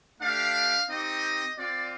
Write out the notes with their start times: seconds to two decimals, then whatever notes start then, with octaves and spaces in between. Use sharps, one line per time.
0.20 A3 D4 G4 F5
0.89 C4 D#4 G4 D#5
1.57 C4 F4 D5